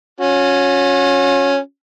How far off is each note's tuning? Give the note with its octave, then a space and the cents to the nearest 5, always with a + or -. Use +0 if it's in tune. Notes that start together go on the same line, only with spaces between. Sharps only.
C#4 +0 F#4 -40